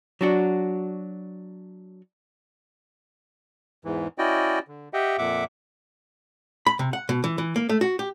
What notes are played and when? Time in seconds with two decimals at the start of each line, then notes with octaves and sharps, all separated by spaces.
0.21 F#3 D4 F#4
3.85 E2 G#2 E3
4.18 C#4 E4 F#4 D5 D#5 G5
4.68 D3
4.93 G4 D#5 E5 F#5 G5
5.18 F2 A#2 E5 F#5 D6
6.66 B5
6.79 C3
6.93 F#5
7.09 B2
7.24 E3
7.38 E3
7.56 A#3
7.69 A3
7.81 F#4
7.99 G4